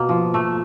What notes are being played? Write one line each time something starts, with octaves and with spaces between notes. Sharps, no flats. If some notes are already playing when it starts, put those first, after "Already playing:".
Already playing: B2 A#3
F3
A3